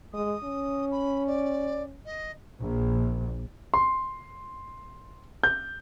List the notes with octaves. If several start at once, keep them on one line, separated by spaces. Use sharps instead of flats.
G#3 D#6
C#4
B5
D5
D#5
A#1
C6
G6